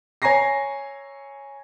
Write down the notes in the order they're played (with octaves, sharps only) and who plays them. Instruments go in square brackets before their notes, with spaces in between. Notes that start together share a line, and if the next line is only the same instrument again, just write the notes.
[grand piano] C#5 G#5 A#5 C#6 A#6 C7